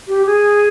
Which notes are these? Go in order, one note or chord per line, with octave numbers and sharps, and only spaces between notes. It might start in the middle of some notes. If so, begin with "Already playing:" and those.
G4
G#4